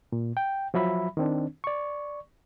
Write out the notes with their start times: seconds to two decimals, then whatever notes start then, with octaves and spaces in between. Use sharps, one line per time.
0.12 A#2
0.37 G5
0.74 F3 F#3 E5 B5
1.17 D#3 C4 D4
1.64 D5 C#6